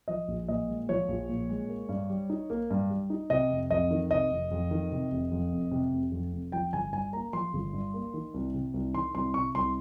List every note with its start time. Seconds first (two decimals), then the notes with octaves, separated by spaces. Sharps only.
0.08 F3 D#5
0.28 A#1
0.48 A#2 D#5
0.68 G#3
0.89 F3 C#5
1.08 A#1
1.29 A#2
1.49 G#3
1.69 A#3
1.89 G2
2.10 G3
2.29 D#4
2.50 A#3
2.70 G2
2.90 G3
3.10 D#4
3.30 C3 D#5
3.50 F1
3.70 F2 D#5
3.91 D#3
4.11 C3 D#5
4.31 F1
4.51 F2
4.71 D#3
4.92 C3
5.11 F1
5.32 F2
5.52 F1
5.72 C3
5.93 F1
6.12 F2
6.32 F1
6.52 F3 G5
6.73 G1 G#5
6.93 G2 G#5
7.13 A#3 A#5
7.33 F3 C6
7.53 G1
7.73 G2
7.94 A#3
8.14 D#3
8.34 C2
8.54 C3
8.74 C2
8.94 D#3 C6
9.14 C2 C6
9.34 C3 C#6
9.55 C2 C6